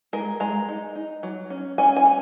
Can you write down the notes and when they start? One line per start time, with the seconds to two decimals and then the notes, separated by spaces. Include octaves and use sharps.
0.13 G#3 A#4
0.40 G#3 A#5
0.69 D#4
0.95 D#4
1.23 F#3
1.50 C#4
1.78 C#4 G#5
1.96 G#5
2.05 C#4